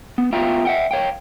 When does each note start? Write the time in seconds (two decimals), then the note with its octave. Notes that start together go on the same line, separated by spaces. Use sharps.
0.18 B3
0.33 B3 F4 E5 F5 G5 A#5
0.65 E5 F#5 G5
0.91 C#5 F5 G5